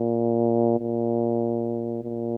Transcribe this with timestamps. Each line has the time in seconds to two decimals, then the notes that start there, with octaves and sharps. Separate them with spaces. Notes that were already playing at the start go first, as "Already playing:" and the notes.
Already playing: A#2
0.80 A#2
2.03 A#2